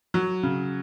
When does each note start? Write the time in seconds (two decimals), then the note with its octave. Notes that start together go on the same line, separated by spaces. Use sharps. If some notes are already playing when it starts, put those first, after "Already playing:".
0.14 F#3
0.43 C#3